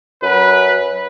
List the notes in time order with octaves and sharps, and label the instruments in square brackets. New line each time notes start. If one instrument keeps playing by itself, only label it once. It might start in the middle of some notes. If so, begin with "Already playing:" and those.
[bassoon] F#2 [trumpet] B4